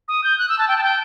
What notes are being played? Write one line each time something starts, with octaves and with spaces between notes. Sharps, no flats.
D#6
G6
F#6
E6
A5
G5
A5
G5